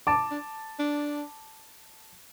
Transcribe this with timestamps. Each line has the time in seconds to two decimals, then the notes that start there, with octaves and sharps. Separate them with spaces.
0.07 D4 A5 D6
0.31 D4
0.79 D4